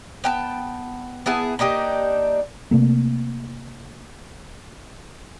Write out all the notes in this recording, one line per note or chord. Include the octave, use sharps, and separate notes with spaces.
B3 G5 A5
B3 E4 G#4 A5
A#3 D4 D#4 G4
C3 A3 A#3